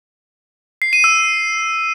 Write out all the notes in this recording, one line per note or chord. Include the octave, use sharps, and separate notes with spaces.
C7
D#7
E6